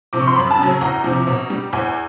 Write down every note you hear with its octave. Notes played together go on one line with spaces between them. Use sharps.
C3 F3 D6
C#6
C6
F#2 B5
A5
C#3 F#3
E2 A#5
C3 F3
B2
G3
E2 G#5